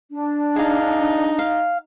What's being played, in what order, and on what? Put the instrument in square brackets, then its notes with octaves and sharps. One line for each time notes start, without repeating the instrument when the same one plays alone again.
[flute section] D4
[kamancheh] D#4 [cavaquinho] G#4 F5
[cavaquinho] F5